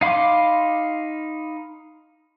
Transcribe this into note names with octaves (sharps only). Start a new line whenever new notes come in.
D#4 F5 B5 C6 D6